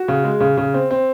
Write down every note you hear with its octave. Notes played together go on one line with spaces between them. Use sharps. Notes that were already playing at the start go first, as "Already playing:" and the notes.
Already playing: F#4
C#3
G#3
C#3
C#3
C4
C4